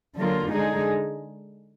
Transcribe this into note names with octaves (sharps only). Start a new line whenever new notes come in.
D3 F#3 A#3 F4
D3 G#3 D#4 G#4